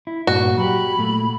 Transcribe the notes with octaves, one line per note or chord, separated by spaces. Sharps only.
E4
G2 A#2 F#4
F#3 G4 B5
A#2 A3